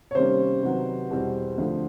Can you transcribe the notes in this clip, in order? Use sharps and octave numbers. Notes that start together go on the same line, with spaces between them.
C#5
C3 D#3 G3 A#3 C#4 C5
C3 D#3 F#3 B3
E2 B2 G3 C4
D2 D3 F3